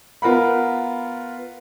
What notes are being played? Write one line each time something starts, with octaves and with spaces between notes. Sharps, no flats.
B3 F4 A#4 F#5 B5